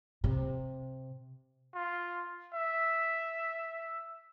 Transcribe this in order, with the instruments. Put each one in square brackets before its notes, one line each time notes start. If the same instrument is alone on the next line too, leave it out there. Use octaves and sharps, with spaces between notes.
[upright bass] C3
[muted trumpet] F4
E5